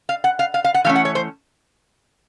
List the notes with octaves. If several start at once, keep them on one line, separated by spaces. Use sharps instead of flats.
F5
F#5
F5
F5
F5
F#5
E3 A3 C#4 F5
F#5
C#5
C5